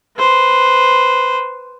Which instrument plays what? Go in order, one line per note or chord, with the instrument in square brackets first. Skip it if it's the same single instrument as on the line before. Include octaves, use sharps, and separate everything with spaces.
[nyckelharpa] B4 C5